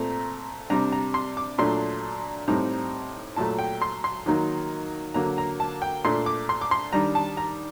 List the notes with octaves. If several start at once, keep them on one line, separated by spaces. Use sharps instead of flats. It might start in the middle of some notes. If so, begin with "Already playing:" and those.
Already playing: A#2 A3 C4 A#5
C3 G3 D4 A#5
A#5
C6
D6
A#2 F#3 A3 D4 C6
A2 G3 C4 D#4 A#5
A#2 F#3 A3 A5
G5
C6
C6
D#3 F#3 A#3 D#4
D3 F#3 A#3 A#5
A#5
A5
G5
A#2 A3 D4 C6
D6
C6
D6
C6
D#3 G3 D4 A#5
A5
A#5